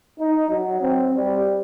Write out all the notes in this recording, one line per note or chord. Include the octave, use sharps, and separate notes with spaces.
D#4
F#3
C4
G3